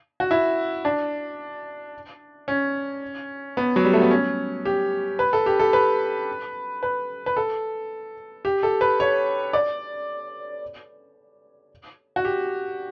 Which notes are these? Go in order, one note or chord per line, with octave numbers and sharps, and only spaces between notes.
F#4
E4
D4
C#4
B3
F#3
G3
A3
B3
C#4
G4
B4
A4
G4
A4
B4
B4
B4
A4
G4
A4
B4
C#5
D5
F#4
G4